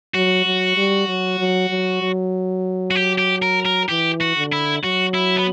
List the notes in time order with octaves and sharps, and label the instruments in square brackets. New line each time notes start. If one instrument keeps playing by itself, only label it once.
[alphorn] F#3 [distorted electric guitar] F#4
[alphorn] F#3
G3
F#3
F#3
F#3
F#3
[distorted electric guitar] F#4
G4
G4
A#4
A#4
[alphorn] E3 [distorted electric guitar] G4
[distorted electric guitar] F#4
[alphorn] D3
[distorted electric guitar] E4
[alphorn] F#3 [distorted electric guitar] F#4
[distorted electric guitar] E4
B3